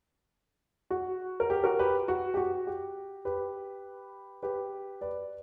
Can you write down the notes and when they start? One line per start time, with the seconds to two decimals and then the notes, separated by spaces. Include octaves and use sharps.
0.90 F#4
1.40 A#4
1.50 G4
1.64 F#4 A#4
1.79 G4 B4
2.08 F#4
2.34 G4
2.37 F#4
2.67 G4
3.25 G4 B4
4.43 G4 B4
5.01 B4 D5